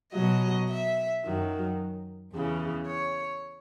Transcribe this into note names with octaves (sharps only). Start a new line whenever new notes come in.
B2 F#3 D#5
E5
F#2 D#3 F#3
E2 C#3 E3
C#5